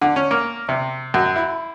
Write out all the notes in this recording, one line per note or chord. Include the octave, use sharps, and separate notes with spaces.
D3
C#4
A#3
C3
F#2
E4